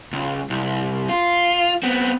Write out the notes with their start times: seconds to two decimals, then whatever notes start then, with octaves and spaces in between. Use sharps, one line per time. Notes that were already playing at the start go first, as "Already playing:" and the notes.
0.13 C#2
0.50 C2
1.09 F4
1.83 B3 C4